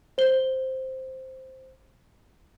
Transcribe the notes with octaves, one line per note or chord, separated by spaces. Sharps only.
C5 G7